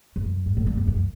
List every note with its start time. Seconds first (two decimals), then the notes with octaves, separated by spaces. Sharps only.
0.16 F#2
0.46 G2
0.57 A2
0.67 G2
0.77 F#2
0.87 F#2